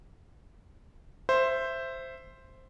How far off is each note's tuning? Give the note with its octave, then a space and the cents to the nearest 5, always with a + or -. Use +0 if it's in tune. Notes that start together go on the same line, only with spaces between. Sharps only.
C5 +0 E5 +10